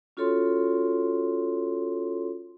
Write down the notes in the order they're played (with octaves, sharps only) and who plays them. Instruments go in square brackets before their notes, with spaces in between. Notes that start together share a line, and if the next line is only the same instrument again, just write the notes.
[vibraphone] C#4 F4 F#4 A4 C#5 C6